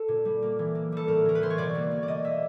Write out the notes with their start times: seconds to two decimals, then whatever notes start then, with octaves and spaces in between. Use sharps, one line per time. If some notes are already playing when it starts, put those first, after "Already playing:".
Already playing: A4
0.08 A#2
0.25 G3
0.42 A#3
0.59 E3
0.75 A#3
0.92 G3 A4
1.08 A2 A#4
1.25 E3 A#4
1.35 B4
1.41 E3 C5
1.50 C#5
1.58 B2 D5
1.75 A#3
1.91 A#3
2.03 D5
2.08 B2 D#5
2.24 A#3 E5